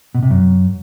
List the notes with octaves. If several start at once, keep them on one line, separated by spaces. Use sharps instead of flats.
B2
C3
F#2